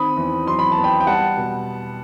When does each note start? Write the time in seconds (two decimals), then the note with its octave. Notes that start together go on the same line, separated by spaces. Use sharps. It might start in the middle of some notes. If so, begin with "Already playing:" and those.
Already playing: D#3 C4 B5 D#6
0.17 E2
0.47 F#3 C6
0.59 B5
0.72 A5
0.77 B3
0.84 G5 B5
1.00 G5
1.06 G3 F#5 A5
1.37 B2